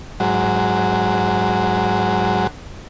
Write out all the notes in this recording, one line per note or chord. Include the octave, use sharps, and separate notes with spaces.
G#2 F#3